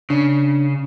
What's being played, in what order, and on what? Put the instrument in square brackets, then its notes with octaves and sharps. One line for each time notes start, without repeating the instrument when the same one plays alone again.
[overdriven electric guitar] C#3 [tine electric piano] D4